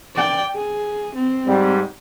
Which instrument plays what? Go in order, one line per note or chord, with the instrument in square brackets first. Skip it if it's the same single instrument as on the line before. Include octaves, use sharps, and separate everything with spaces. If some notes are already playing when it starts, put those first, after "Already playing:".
[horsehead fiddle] D5 G5
G#4
C4
[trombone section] G#2 G3